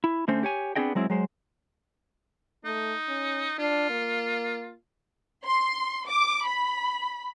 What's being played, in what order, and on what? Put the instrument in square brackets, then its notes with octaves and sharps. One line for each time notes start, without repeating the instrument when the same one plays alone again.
[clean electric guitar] E4
D3 A3 C4 C#4 C5
G4 C#5 G#5
B3 C4 D4 G#4 D#5 G5
F#3 G#3 C4 E4
F#3 G#3 C5
[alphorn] A3 [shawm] D#4
[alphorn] C#4
[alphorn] D4 [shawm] F4
[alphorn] A#3
[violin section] C6
D6
B5